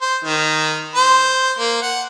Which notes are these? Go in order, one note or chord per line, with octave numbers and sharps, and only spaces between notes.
C5
D#3
C5
A#3
F#5